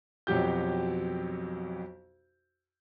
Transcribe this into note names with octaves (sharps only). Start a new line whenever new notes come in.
B1 F2 F#3 G4 G6